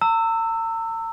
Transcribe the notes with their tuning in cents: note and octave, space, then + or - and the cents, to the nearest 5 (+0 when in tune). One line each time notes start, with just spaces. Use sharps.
A#5 -45 E6 +0